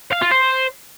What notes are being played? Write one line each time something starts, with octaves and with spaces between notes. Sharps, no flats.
F5
F4
C5